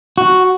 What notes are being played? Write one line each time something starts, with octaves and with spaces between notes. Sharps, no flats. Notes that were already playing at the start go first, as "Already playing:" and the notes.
F#4